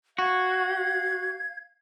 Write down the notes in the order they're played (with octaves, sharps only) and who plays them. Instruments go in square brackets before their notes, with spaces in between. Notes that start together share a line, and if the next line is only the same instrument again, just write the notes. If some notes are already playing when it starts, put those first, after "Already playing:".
[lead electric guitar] F#4 [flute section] F5 G#6